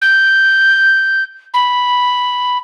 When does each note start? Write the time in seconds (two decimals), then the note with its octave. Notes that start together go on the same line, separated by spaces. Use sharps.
0.02 G6
1.54 B5